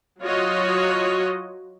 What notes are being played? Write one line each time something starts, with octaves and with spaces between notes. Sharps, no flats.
F#3 F4 F#4 C#5 D#5